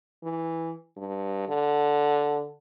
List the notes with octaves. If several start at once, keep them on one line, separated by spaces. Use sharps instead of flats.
E3
G2
D3